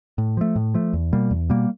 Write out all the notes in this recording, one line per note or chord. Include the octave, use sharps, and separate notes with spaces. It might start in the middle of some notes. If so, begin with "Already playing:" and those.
A2
F3 A3
A2
F3 A3
E2
B2 G3 A#3
E2
B2 G3 A#3